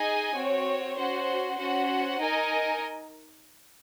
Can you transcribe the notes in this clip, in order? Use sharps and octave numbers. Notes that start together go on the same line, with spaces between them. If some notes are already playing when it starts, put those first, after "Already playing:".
Already playing: D#4 G#4 D#5 G#5
C4 F#4 C#5
C#4 F#4 C5 F#5
C#4 F#4 C5 F#5
D#4 A#4 D#5 G#5